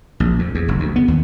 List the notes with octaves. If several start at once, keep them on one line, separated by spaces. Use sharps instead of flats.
A#1
F2
E2
F#1
D2
B3
D#2